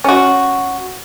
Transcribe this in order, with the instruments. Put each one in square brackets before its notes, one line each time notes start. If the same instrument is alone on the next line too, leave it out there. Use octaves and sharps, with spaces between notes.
[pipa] C#4 F#4